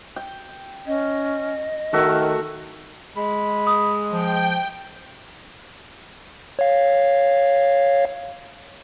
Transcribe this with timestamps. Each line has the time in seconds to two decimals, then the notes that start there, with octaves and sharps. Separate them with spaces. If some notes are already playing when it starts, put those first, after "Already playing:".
0.16 G5
0.87 C#4 D#5
1.93 D#3 A3 F#4 A#4 E5
3.17 G#3 B5
3.67 D#6
4.13 F3 G5
6.59 C#5 F5